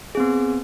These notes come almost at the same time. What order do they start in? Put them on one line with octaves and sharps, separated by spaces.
G#4 C4 B3